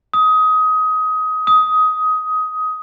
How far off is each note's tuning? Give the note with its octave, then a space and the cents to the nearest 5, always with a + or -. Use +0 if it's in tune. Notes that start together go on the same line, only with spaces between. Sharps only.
D#6 +20
D#6 +15